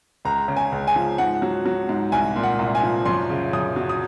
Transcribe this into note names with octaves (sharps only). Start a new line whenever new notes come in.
C#2 A#5
C#3
G#5
C#2
G#5
F3
G#2 F#5
F#3
F#3
G#2
C2 G#5
A#2
F#5
C2
G#5
F3
F#2 C6
C#3
F#2 D#6
F#3
D#6